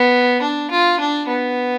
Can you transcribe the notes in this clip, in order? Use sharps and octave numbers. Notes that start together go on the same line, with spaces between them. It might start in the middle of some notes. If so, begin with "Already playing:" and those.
Already playing: B3
D4
F4
D4
B3